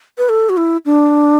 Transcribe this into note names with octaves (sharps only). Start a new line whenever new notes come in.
B4
A4
F#4
E4
D4